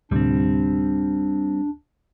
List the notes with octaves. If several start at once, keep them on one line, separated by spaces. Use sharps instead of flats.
D2 A2 C3 G3 C4 D4